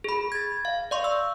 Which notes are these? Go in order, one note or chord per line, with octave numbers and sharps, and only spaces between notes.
G#4 B5
G#6 A6
F5
D5 F5 C6 C#6
E6